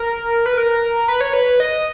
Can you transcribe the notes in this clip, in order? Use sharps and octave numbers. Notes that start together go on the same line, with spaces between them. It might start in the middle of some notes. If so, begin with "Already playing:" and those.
Already playing: A#4
B4
A#4
B4
C#5
B4
D#5